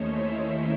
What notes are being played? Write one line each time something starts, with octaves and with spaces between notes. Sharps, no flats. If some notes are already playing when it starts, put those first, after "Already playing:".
Already playing: D#2 D#3 A3 C#4 D#4 C5 C#5
E4 E5